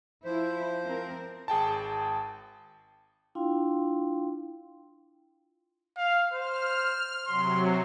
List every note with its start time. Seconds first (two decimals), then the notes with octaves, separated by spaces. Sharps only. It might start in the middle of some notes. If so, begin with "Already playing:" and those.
0.25 F3 E4 C5
0.84 C4 A#4
1.48 G#1 G#4 G5 A5
3.35 D4 E4 F4 F5 G5 C6
5.97 F5
6.33 C5 F6
7.27 C3 F#3 C6